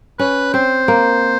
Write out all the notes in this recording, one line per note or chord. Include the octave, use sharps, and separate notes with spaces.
C#4 B4
C4 C5
A#3